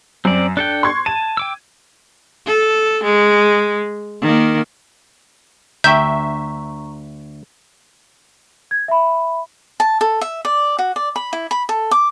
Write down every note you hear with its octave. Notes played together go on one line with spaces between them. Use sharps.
F#2 C4 D5
D4 A4 G5 F#6
C6 C#6 G#6
A5 D#7
G5 D6 E6
A4
G#3
D#3 A#3
D2 E5 G5 A#5 C#6 G6
G#6
E5 B5
A5
A4
E5
D5
F#4
D5
B5
E4
B5
A4
D6